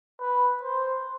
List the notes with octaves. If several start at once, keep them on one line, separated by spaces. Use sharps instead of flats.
B4
C5